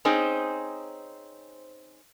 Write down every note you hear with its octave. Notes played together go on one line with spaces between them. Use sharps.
C4 C#4 D#4 G#4 C5